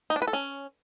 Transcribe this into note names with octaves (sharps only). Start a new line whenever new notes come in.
D#4
D4
B4
A4
C#4